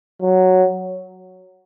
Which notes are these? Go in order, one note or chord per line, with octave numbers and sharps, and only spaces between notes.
F#3